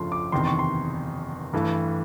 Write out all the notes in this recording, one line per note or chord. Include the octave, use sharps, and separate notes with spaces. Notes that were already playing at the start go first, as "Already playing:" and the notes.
Already playing: G1 F2 C#3 F3 A3 C6
D6
F#1 E2 C3 D#3 C6
C#6
C6
G2 E3 A3